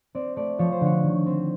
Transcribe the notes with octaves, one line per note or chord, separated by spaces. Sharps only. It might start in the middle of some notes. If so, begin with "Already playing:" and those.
C4 D5
A3 D5
F3 C#5
C5
D3 C#5
D#3
C4